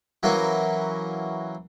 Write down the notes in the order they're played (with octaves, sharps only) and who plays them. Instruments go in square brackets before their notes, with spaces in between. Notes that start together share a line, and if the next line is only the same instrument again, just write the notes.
[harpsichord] E3 F#3 A#3 C#4